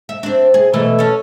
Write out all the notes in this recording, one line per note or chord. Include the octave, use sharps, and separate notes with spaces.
E5
C4 D4
G#4
B2 E3 A3
C#4 A4